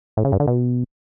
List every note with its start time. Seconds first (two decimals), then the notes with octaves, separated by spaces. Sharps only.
0.17 A2
0.25 C#3
0.32 G2
0.40 D3
0.47 B2